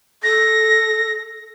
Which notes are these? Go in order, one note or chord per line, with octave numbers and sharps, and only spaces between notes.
A4 A#6